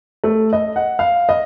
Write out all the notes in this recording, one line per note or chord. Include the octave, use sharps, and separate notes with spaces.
A3
D#5
F#5
F5
D#5